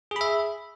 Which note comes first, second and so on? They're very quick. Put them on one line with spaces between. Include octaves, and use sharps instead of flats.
G#4 B5 E5